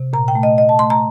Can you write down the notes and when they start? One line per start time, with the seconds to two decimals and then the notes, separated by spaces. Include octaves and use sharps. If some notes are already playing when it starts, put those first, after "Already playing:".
Already playing: C3
0.13 A#2 A#5
0.28 G5
0.35 A3
0.43 D#5
0.57 A3 D#5
0.69 A5
0.79 A3 C6
0.90 A#5